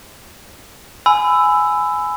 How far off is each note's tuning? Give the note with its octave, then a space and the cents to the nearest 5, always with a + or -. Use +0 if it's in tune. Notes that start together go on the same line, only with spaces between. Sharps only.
G#5 +10 B5 +25 E6 +0